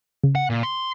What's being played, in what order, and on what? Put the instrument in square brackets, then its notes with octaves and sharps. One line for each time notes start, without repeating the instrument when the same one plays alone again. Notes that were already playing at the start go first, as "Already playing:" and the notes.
[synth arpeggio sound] C#3
[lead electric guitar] F#5
A#2
C6